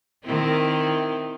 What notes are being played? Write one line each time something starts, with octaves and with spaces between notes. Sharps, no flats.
D#3 C4 E4